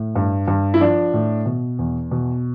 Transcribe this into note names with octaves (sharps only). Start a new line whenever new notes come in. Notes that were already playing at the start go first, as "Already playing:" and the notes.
Already playing: A2
G2
G2
E4
F3 D4
A2
B2
E2
B2